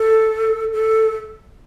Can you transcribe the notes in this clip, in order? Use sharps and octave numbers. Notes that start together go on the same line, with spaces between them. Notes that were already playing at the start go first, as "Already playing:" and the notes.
Already playing: A4
A4